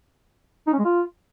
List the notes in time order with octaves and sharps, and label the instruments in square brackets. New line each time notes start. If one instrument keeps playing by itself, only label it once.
[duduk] D#4
C#4
G#3
F4